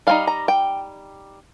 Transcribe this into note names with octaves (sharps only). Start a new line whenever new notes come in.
G3 C4 D#4 F5
A#5
G5